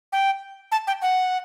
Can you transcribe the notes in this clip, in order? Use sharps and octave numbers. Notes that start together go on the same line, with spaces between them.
G5
A5
G5
F#5